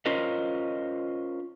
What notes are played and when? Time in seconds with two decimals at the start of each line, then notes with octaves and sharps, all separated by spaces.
0.06 C#4 F4 A#4 C5 D#5